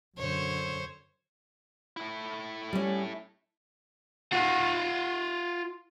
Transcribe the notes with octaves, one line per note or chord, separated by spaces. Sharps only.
F#2 D3 C5 C#5
A3 E4
G3 C#4
F4 F#5